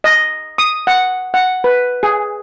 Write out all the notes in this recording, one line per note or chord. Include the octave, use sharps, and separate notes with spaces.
D#5
D#6
F#5
F#5
B4
G#4